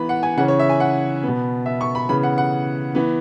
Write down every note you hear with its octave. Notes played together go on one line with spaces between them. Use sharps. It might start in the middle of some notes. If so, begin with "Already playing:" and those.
Already playing: E3 B3 B5
F#5
G#5
C#3 E3 C#4 F#5
C#5
E5
G#5
F#5
B2 B3
E5
C#6
B5
C#3 E3 B3 B5
F#5
F#5
E3 B3